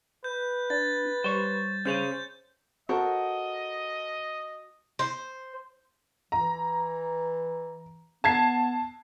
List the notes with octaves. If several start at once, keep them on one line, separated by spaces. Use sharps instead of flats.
B4 G6
D4 A6
G3 C5 C#5
C#4 G#4 C5 C#5 G6
F#4 A4 A#4 C5 D#5
C5
E3 A#5
B3 A5 G#6 C7